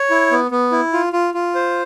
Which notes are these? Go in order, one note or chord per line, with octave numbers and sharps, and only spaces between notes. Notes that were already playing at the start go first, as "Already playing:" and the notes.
Already playing: C#5
E4
B3
B3
E4
F4
F4
F4
C5